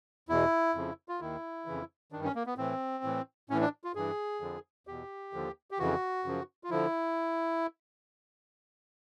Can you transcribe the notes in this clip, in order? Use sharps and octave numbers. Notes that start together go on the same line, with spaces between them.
E2 B2 E4
F2 C#3 F3
F4
D#2 D#3 E4
F2 C#3 E3
G2 D#3 D4
C#4
A#3
B3
A2 E3 C4
A2 E3
A2 E3 C#4
D4
F4
G2 E3 G#4
F2 D3 F3
E2 B2 G4
D#2 D3 F3
G4
F2 C#3 E3 F#4
F#2 C#3 F3
F4
D3 F3 E4